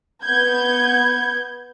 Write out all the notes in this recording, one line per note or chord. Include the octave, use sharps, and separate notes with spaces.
B3 G6 G#6